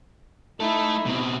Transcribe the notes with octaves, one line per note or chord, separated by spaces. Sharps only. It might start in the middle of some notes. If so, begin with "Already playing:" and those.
A3 D#4 E4 A4
B2 C4